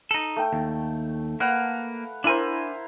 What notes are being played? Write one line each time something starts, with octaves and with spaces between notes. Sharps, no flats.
D#4 A4
A3 G5
D#2
A#3 B4 F5 F#5
D4 E4 A#4 C5 G#5